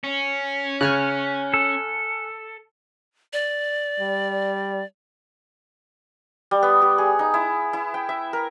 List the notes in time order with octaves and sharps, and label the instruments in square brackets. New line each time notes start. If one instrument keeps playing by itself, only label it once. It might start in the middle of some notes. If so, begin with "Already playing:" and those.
[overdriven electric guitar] C#4
[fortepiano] C#3 [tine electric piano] G#5 F6 F#6
[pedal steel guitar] A4
[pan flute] D5
[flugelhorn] G3
[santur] G3
B3
G4
G#4
D#4
E4
E4
G5
E5
A#4